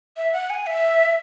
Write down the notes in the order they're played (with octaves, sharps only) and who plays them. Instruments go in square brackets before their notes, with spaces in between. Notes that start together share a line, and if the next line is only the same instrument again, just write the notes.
[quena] E5
F#5
G#5
E5